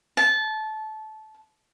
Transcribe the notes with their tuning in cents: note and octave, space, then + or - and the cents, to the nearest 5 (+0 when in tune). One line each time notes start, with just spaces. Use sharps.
A5 -20